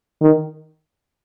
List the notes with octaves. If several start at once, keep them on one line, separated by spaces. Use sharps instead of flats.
D#3